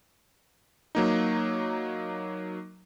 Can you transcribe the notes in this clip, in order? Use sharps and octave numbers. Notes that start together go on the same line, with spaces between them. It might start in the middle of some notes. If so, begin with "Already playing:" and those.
F#3 A#3 D#4